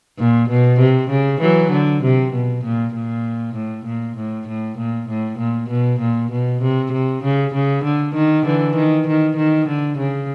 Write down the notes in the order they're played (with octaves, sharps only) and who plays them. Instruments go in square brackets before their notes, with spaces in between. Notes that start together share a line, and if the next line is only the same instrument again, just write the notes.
[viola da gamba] A#2
B2
C3
C#3
E3 F#3
D3
C3
B2
A#2
A#2
A2
A#2
A2
A2
A#2
A2
A#2
B2
A#2
B2
C3
C3
C#3
C#3
D3
D#3
D3 E3
D#3
D#3
D#3
D3
C#3